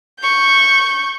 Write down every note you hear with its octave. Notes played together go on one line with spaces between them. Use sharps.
C#6 G6